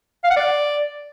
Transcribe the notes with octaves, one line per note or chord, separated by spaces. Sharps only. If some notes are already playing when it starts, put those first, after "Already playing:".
F5
F#5
D5